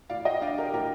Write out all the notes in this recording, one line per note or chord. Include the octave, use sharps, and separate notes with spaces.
A2 D5 F5
D#5 G5
D4 D5 F5
G4 A#4
A2 G4 A#4